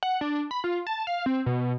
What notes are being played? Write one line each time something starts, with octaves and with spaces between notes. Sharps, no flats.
F#5
D4
B5
F4
A5
F5
C4
B2